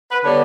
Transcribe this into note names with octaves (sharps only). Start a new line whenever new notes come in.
B4
D3 G3 B3 C#5